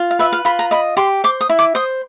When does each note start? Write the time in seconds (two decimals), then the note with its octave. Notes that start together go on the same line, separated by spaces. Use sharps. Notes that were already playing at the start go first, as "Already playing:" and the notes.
Already playing: F4
0.11 F5
0.19 B4 E5
0.32 F5
0.45 F4 B5
0.59 A#5
0.71 D#5 B5
0.97 G4 C6
1.24 C5 D6
1.41 D#6
1.49 E4
1.59 D6
1.75 C5 D#6